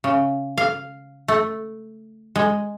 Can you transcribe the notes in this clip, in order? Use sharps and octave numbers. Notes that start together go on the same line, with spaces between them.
C#3
F5
A3
G#3